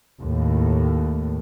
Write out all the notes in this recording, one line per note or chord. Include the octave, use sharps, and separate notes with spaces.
D#2 A2